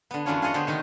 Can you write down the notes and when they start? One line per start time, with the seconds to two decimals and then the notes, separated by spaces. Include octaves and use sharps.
0.11 D3 B3
0.26 F#2 E3 F#3 D4 F4 C#5
0.42 F4 G#4 C#5 D#5 F#5
0.54 D3 A3 B3 G4 C5 C#5
0.67 C3 D#3 D#4